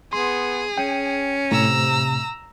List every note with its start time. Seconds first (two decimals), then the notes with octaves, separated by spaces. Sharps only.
0.13 B3 G#4 C6
0.78 C#4 G5
1.52 A2 C3 A#5 E6